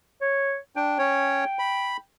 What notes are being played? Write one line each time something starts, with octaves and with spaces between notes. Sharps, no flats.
C#5
D4 G5
C#4 C#5
B5